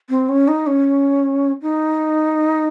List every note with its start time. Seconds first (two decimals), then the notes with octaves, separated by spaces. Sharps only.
0.10 C4
0.29 C#4
0.48 D#4
0.67 C#4
1.62 D#4